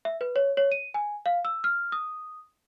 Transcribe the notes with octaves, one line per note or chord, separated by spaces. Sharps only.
E5
B4
C#5
C#5
D#7
G#5
F5
E6
F6
D#6